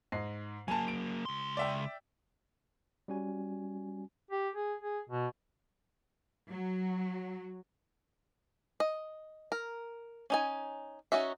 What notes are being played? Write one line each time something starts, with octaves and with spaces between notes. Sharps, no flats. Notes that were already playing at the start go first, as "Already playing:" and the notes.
G#2 D#5 C7
F#3 A#3 G#5 A5
D7
C#2 C6
D5 E5 G5
G3 C#4 F#4 G#5
G4
G#4
G#4
B2
F#3
D#5
A#4
C#4 D#4 G#5
C#4 D#4 F#4 E5